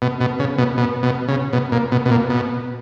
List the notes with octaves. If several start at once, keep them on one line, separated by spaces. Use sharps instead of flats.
B2
B2
C#3
B2
B2
B2
C#3
B2
A#2
B2
B2
A#2
B2